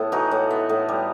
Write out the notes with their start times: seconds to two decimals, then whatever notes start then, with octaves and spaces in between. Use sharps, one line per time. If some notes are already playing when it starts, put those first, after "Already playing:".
Already playing: A2 B3 A4
0.12 E3 D#4 F#4
0.31 A2
0.50 B3
0.69 A2
0.89 G3